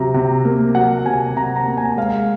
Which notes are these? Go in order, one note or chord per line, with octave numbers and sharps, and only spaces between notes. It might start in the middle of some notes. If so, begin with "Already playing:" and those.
Already playing: C3 F#3 A#5
C3
A#3
F#3 F#5
C3 G#5
C3 A#5
A#5
A#3
G#5
G#3 F5